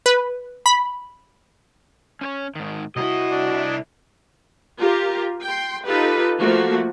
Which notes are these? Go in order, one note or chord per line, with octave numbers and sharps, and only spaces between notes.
B4
B5
C#4 C5 C#5
G#2 D#3
C2 E4 F#4 D#5
D4
F4 G4 A#4
G5 C6
D#4 F4 G4 A4 B4
F3 A3 A#3 F#4